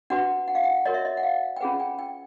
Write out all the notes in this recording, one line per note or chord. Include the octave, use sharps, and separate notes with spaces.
D4 F#4 B4 F#5
F#5
F5
F#5
F#4 A#4 C#5 D#5
E5
D#5
F#5
F5
G5
C#4 F4 G#4 B4 F#5
G5
G5